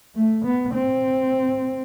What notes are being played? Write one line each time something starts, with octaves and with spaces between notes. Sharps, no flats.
A3
B3
C4